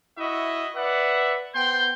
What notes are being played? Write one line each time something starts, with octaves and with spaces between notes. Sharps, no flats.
E4 F#4 D#5 E5
B4 D5 E5 F#5
B3 C5 G5 C6 G6